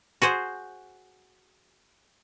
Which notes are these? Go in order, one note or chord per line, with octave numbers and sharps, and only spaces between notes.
F#4 G#4 C5